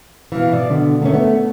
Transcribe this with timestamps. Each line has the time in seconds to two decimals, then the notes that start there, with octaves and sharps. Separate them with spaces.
0.32 B2 E3 F5
0.52 B2 D5
0.70 D3
1.02 D#3 A3 C#4
1.14 B3